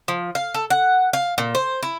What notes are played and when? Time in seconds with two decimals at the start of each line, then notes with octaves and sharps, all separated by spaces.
0.08 F3
0.35 F5
0.54 A4
0.70 F#5
1.13 F5
1.38 A#2
1.55 C5
1.83 E4